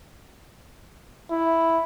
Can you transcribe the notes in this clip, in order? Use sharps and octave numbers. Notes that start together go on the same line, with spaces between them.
E4